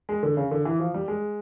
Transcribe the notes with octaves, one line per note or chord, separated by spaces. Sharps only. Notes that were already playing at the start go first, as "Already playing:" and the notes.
G#3
D3
C#3
D3
E3
F3
G3
G#3